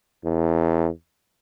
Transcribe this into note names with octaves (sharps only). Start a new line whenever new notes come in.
E2